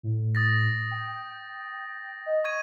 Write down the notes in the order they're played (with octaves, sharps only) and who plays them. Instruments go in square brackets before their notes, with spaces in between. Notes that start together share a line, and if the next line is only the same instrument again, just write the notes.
[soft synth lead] A2
[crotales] D#6 A6 A#6
[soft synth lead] G5
D#5
[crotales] C#6 G#6 D#7